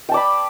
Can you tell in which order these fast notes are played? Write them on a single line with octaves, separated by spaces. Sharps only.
G5 A5 D5 B5